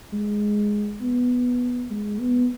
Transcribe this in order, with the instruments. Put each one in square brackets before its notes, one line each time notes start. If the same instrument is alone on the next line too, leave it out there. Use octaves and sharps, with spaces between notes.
[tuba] G#3
B3
G#3
B3